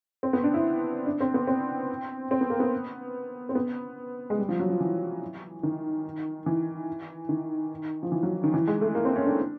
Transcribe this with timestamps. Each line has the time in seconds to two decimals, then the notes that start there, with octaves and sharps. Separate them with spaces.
0.23 C4
0.33 B3
0.44 D4
0.54 E4
1.06 D4
1.21 C4
1.34 B3
1.47 C4
2.31 C4
2.41 B3
2.50 A#3
2.60 B3
3.49 C4
3.55 B3
4.30 G#3
4.38 G3
4.49 F3
4.59 F#3
4.70 F3
4.80 E3
5.63 D#3
6.46 E3
7.29 D#3
8.03 F3
8.12 E3
8.23 F#3
8.33 F3
8.44 D#3
8.54 E3
8.67 G#3
8.81 A3
8.95 A#3
9.05 C4
9.16 C#4
9.26 D4